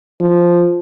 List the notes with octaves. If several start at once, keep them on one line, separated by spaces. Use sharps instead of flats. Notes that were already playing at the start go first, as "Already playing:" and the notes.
F3